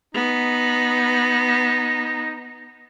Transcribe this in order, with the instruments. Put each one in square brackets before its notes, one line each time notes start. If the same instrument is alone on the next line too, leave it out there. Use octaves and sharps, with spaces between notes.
[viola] B3 [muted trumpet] D#4